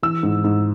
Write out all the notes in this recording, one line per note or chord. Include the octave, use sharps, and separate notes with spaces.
E3 E6
G#2
G#2